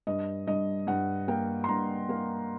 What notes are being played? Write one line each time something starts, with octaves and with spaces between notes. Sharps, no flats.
G2 D#5
G2 D#5
G2 F#5
A#3 G5
C6
G2 A#5
A#3